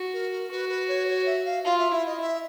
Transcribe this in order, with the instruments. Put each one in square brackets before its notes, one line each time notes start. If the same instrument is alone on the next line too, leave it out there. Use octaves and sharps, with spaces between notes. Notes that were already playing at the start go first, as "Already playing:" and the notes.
Already playing: [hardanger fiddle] F#4
[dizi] A#4
A#4
[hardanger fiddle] F#4 [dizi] B4
[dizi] B4
C#5
C#5
E5
F5
[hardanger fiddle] F4 [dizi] F5
[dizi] E5
[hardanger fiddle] E4 [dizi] E5
[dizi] D#5
E5